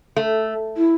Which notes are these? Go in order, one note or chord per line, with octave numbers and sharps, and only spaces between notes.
A3
E4